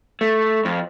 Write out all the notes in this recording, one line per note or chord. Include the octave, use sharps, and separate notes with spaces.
A3
F2